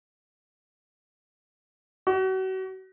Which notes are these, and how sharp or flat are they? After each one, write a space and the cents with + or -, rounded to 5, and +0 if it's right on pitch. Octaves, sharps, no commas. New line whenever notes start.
F#4 +35